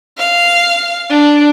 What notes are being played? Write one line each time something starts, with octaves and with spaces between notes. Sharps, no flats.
F5
D4